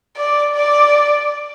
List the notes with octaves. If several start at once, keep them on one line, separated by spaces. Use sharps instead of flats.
D5
D5